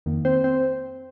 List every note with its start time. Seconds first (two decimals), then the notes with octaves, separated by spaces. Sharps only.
0.06 F2 D#3 A#3
0.25 C4 C5
0.44 C4 C5